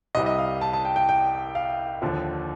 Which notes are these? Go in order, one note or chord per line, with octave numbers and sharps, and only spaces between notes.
C2 C3 G3 D#5
D#5
F5
A5
A5
G5
G5
G5
F5
D#2 D3 F3